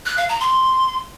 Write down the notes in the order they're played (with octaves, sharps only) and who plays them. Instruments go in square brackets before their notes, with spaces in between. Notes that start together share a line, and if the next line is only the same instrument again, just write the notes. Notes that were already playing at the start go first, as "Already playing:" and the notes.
[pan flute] F#6
F5
A#5
C6